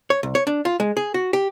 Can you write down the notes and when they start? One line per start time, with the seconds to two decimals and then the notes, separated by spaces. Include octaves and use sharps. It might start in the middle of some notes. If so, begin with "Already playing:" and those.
0.10 C#5
0.23 C2
0.35 C#5
0.47 D4
0.65 F4
0.80 G#3
0.97 G#4
1.14 F#4
1.33 G4